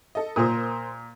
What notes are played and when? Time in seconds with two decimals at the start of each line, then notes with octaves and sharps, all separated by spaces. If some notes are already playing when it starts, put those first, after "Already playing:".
0.15 A4 D#5
0.36 A#2 A#4 C5 D#6